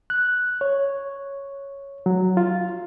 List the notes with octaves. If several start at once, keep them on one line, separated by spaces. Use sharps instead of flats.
F#6
C#5
F#3
F4